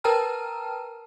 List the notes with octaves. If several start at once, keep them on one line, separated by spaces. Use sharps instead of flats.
A#4 B4 G5 A5 A#5 F6